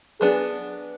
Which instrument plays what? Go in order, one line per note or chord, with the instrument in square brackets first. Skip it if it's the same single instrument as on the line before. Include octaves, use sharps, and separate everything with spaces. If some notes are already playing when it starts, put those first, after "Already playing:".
[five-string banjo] F#3 B3 D4 [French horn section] G#4